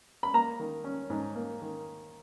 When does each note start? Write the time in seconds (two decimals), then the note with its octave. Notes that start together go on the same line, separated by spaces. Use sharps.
0.23 B5
0.34 A#3 A#5
0.60 D#3
0.84 C#4
1.10 G#2
1.35 A#3
1.62 D#3